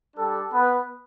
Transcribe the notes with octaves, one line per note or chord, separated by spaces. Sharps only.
G3 D4 G4 A4
B3 B4